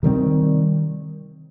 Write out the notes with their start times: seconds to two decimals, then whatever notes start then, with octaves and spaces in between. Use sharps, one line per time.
0.03 C3 D#3 G3 C4